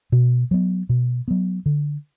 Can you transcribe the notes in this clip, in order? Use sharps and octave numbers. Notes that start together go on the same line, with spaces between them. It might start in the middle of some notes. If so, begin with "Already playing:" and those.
B2
F#3 B3
B2
F#3 B3
D3